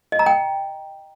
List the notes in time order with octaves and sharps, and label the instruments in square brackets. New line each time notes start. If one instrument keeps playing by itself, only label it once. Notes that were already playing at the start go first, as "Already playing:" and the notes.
[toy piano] D#5
A#5
G5